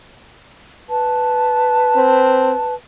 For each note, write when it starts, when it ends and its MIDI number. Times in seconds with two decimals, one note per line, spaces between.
0.88 2.73 71
0.88 2.73 81
1.96 2.54 60